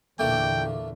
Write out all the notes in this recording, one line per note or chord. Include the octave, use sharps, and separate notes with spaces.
E2 A#2 D3 A3 A#3 D4 G5